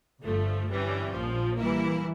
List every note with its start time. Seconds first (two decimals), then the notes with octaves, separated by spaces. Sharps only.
0.23 G1 G2 F3 A3
0.69 G1 G2 E3 G3 C#4
1.14 A#1 A#2 F3
1.58 E3 G3 A#3 E4